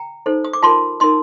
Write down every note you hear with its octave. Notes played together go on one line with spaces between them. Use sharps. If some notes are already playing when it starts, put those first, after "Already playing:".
Already playing: G5 A#5
D#4 A4 C5
D#6
D6
F4 A#4 A5 C6
D#4 A#4 C6 D#6